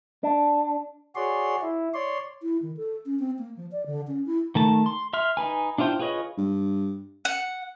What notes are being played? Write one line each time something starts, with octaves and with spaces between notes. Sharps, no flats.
D4
F#4 G#4 C#5 D5 C6
E4
C#5 D5 C6
E4
D#3
A4
C#4
C4
A#3
F3
D5
D3
C#4
E4
D#3 A3 A5
C6
E5 C6 F6
D#4 B4 G#5
D4 E4 F4 C5 G5
F4 G#4 B4 C#5 D#5
G2
F#5